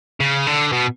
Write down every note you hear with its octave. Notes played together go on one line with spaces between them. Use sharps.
C#3
D3
B2